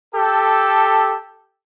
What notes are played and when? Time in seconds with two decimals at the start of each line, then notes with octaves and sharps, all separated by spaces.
0.14 G4 A4